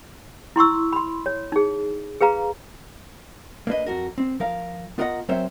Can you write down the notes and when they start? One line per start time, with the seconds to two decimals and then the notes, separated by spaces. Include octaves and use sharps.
0.56 E4 C6 C#6 E6
0.93 B5 C6
1.26 C#5
1.52 D#4 G#4
2.21 G#4 B4 F5 A#5
3.67 A#3 D4 B4 D#5
3.86 F2 F#4 A#4
4.18 C4
4.40 F3 A#4 F5
4.98 B3 F4 A#4 D#5 F#5 A#5
5.29 F#3 C4 A#4 C5 C#5 E5